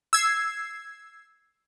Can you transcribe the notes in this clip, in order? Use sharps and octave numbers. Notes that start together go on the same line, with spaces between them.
E6 G#6 C7